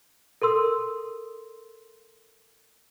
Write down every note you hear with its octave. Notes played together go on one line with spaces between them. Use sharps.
A4 A#4 C6 E6